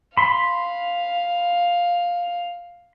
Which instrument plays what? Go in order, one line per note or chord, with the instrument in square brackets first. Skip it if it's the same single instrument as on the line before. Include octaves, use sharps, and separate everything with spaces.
[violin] F5 [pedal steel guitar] B5 C6